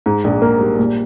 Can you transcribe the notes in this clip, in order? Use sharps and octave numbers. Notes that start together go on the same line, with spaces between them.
G#2
A#1
A#3
G3
A#2